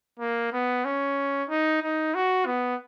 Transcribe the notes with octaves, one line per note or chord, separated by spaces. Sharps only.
A#3
B3
C#4
D#4
D#4
F#4
B3